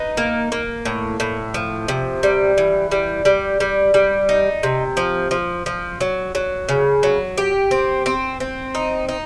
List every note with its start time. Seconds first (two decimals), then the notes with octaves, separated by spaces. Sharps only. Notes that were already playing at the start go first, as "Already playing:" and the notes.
Already playing: D#4 B4
0.17 A#3
0.52 A#3
0.85 A2
1.20 A2
1.54 F3
1.88 C3
2.23 G3
2.58 E3
2.91 G3
3.25 G3
3.60 G3
3.94 G3
4.29 D#4
4.63 C3
4.97 F3
5.31 F3
5.66 F3
6.01 F#3
6.35 F#3
6.69 C#3
7.03 F#3
7.38 G4
7.71 C4
8.06 C4
8.40 C4
8.75 D#4
9.09 D#4